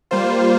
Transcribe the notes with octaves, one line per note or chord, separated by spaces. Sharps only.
G3 A#3 F4 C5